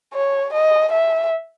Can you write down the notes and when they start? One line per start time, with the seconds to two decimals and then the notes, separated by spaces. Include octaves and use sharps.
0.14 C#5
0.53 D#5
0.92 E5